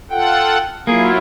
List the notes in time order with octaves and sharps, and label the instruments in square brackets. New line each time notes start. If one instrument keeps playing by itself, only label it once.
[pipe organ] F4 A4 F#5 [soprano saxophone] G5
[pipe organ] F#3 E4 F4 [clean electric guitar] A#3 [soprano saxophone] G#4